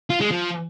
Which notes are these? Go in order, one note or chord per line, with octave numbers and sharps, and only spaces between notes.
F4
G#3
F3